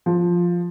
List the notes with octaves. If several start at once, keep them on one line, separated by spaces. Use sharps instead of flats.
F3